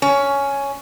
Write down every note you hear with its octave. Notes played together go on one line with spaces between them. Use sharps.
C#4